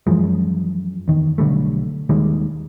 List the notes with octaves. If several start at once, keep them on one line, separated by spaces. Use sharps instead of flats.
F#2 E3 F3 G#3
E2 D#3
B1 D3 G3 A3
D#2 D#3 G3 G#3